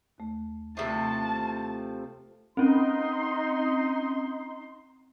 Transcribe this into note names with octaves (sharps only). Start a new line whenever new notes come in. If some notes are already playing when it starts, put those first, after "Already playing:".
D#2 A3
C3 E3 F3 A3 E5 A5 A#5 E6
C4 C#4 D#4 C6